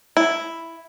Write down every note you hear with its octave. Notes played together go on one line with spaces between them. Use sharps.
E4